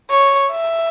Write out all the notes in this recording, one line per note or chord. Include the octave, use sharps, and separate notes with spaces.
C#5
E5